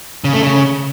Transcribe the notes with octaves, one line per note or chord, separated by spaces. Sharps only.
C#3
A3
C#3